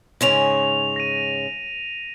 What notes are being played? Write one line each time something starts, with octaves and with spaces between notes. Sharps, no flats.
G#2 C#3 C#4 A#6 E7 F7
A#6 D#7